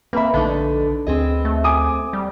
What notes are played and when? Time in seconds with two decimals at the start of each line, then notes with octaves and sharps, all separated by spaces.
0.13 A#3 C4 B4 E5 B5
0.34 A#1 D3 A3 D4 D#4
1.07 D2 C4 G#4 D#5
1.45 A3
1.64 G#5 D6 D#6
2.13 G3